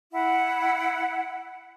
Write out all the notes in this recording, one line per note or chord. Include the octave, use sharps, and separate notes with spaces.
E4 F#5